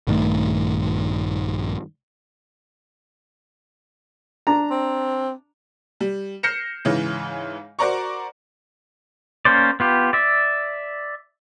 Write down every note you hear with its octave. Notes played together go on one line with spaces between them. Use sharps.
A#1 G2 D#3 A3
D4 A#5
C4
G3
F6 G6 A#6 C7 C#7 E7
G#2 C#3 E3
F#4 A#4 C5 D5 A#5 C#6
A#3 C#4 C5 D5
B3 F4 G4
D5 E5